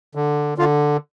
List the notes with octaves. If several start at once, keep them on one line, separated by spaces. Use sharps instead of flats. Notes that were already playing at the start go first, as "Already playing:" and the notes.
D3
D3 F4